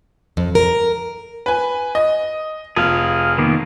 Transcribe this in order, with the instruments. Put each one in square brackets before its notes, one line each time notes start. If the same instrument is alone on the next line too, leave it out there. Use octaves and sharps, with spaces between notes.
[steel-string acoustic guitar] F2
A#4
[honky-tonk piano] B4 G#5
D#5
[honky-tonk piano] F1 [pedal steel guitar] G#4 F5
[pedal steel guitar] D#3 A#3 B3